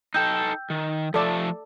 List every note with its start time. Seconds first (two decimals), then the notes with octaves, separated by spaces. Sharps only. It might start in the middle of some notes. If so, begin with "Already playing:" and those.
0.14 D#4 A4 G5 E6 G6
0.70 D#3
1.14 F3 A3 A4 D5 E5